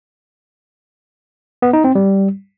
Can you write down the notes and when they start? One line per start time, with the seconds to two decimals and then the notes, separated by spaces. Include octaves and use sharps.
1.62 B3
1.73 D#4
1.84 C4
1.95 G3